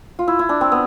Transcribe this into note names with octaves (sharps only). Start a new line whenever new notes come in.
F4
E4
E4
D4
C4
B3